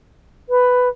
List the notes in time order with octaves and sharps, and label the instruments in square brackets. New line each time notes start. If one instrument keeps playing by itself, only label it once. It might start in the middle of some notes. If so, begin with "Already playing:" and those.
[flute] B4